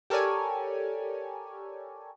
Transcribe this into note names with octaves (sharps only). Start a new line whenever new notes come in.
G4 A4 A#4 C#5 D5 G#5